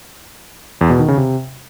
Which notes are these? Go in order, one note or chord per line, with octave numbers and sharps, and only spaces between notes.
E2
B2
D#3
C#3
C3